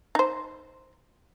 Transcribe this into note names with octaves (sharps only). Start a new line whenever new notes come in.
D#4 C5